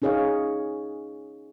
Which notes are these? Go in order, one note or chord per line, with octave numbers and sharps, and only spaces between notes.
C#4 D#4 G#4 C#5 D#5 F5